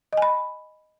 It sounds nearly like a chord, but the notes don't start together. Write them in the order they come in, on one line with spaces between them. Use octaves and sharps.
D#5 G#5 B5